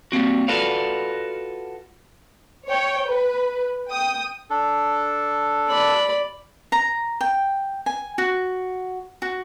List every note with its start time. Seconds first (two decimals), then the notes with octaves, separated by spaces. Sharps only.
0.12 G3 A#3 C4 F#4
0.48 F4 F#4 A4 B4 D5 F5
2.68 C#5 G5
3.06 B4
3.90 G5 D#6
4.50 D4 A4
5.69 D5 B5
6.72 A#5
7.21 G5
7.86 G#5
8.18 F#4
9.22 F#4